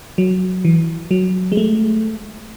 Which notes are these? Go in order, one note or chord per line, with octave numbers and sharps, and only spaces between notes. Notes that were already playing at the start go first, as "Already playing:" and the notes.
F#3
E3
F#3
G#3
A3